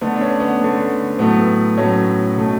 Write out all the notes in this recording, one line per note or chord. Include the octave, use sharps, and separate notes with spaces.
D3 A3 B3
D4
C#4
B3
D3 A3
A2 F#3 A3 B3
A2 F#3 A3 C#4
B2 A3